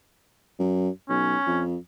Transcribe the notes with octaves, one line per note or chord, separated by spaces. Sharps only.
F#2
B1 C#4
F2